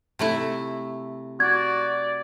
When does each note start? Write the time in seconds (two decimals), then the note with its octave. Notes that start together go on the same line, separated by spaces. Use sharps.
0.19 C3 A3 E4
1.40 F#4 D5 G#6